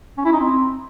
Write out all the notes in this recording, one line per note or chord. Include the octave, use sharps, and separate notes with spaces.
C#4
E4
D#4
C4